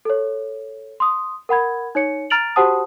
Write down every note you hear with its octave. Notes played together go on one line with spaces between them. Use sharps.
A4 C#5
C6 D#6
A#4 F#5 B5 G#6
D#4 C#5 C#7
A#5 F6 A6 D7 F7 F#7
F#4 G4 C5 F#5 A5 D#6